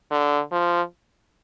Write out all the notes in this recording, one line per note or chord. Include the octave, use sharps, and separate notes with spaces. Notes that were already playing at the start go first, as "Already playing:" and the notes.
D3
F3